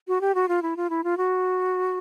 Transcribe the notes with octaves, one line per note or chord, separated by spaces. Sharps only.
F#4
G4
F#4
F4
E4
F4
E4
F4
F#4